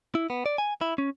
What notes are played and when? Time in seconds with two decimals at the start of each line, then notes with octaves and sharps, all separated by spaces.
0.15 E4
0.30 B3
0.46 D5
0.58 G#5
0.81 E4
0.98 C#4